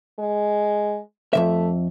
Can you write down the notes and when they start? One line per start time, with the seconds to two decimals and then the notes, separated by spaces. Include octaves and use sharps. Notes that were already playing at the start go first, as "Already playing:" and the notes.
0.19 G#3
1.33 F2 C3 A3 E5